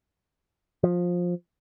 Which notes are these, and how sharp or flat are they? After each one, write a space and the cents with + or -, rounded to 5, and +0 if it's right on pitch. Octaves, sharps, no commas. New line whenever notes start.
F3 +15